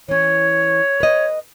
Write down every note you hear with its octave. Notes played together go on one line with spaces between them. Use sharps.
E3 C#4 C#5
B4 D#5